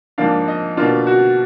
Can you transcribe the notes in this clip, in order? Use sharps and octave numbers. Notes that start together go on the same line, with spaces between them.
G#2 F3 A#3 D4 F5
D#5
B2 A#3 D4 F4
F#4